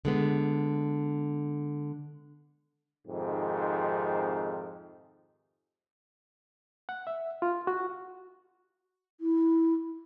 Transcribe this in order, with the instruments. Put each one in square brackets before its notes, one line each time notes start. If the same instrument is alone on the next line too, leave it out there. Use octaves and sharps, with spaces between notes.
[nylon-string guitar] D3 G#3 B3
[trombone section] F2 G#2 C3 D#3 F3
[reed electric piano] F#5
E5
F4
F#4
[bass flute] E4